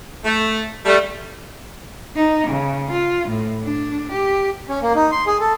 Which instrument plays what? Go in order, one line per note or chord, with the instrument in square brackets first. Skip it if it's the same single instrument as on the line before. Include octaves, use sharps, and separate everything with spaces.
[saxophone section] A3
G3 A3
[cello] D#4
C#3
F4
A2
D4
G4
[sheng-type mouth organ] C#4
A#3
D#4
C6
G#4
A4